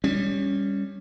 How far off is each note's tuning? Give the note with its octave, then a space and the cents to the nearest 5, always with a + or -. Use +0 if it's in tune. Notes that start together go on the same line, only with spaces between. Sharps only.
G3 +20 C#4 +0